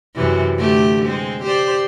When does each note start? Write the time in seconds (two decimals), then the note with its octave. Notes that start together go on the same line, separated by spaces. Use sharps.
0.15 F#2 C3 E3
0.56 D3 A3 G4
1.05 G#3 C4
1.43 G4 C5 D5